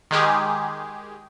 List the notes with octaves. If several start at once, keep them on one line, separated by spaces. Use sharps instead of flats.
D#3 G#3 G4 G#4